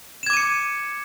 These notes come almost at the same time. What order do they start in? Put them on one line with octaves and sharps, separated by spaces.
E7 G#6 D6 D#7 C#7